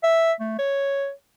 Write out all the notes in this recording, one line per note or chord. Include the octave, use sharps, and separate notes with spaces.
E5
A3
C#5